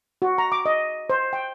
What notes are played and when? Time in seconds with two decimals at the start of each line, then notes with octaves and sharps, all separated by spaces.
0.22 F#4
0.38 A#5
0.52 D6
0.66 D#5
1.10 C5
1.33 G5